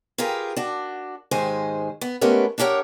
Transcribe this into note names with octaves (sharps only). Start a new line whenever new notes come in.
F4 G4 G#4 A#4 B4
D4 F#4
D#2 G#2 D#3 G#3 C5 G#5
B3
G#3 A3 B3 C#4 G4 A#4
D4 E4 G4 A#4 C#5 F#5